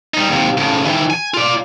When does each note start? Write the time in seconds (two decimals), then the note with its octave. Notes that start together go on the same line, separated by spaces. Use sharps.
0.14 G3 D#4
0.29 D#2 C3
0.57 A2 C#3
0.85 D#3 E3
1.10 G#5
1.34 F4 D5